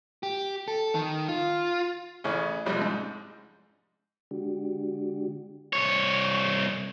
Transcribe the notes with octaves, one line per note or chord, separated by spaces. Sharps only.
G4
A4
D#3
F4
A1 C#3 C#4
A1 F2 C3 G3 G#3
G#2
D3 G#3 D4 F#4 G4
C2 C#5